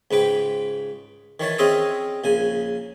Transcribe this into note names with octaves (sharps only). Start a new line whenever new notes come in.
C#2 G#2 B4 G5
D#3 E3 C#5 A5
C4 C#4 F4 G#4 D#5 E5
A#1 C#3 G#5